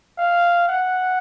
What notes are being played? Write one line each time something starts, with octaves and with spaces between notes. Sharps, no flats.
F5
F#5